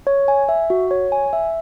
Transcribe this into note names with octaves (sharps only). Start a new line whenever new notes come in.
C#5
G#5
E5
F#4
C#5
G#5
E5